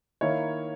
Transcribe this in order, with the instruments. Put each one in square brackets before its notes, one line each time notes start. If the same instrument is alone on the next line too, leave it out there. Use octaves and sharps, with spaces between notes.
[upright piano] D#3 A#3 E4 C#5